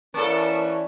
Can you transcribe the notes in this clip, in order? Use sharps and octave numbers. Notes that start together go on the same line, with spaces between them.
E3 A#3 C#4 A4 D5 A5 C#6